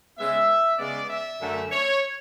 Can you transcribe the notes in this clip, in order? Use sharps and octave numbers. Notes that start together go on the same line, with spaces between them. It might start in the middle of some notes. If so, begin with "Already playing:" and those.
C#3 G#3 B3 E5
C#3 G#3 B3 D5
E5
F#2 D3 A3
C#5